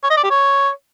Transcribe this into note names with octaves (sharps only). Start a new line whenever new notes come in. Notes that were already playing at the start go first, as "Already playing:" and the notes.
C#5
D#5
D5
G4
C#5